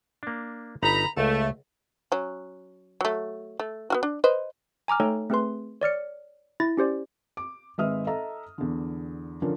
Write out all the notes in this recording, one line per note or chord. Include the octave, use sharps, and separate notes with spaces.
A#3 D4
G1 D#4 A#5 B5
C#2 A3
F#3 C#4
F#3 A3
A3
B3 F4 F#4
D4
B4 C5 D#5
G#5 A#5 D6 F6
A3 D#4 A4 C#5 G5 A#5
A3 C4 G#4 B4 C6
C#5 D5 F6 C#7
E4 A6 A#6
C#4 G4 C5 D5
D6
G#1 G#3 B4 E5 D#6 F6
A4 D#5 E5 A#5
E2 D3
D3 F3 C#4 A#4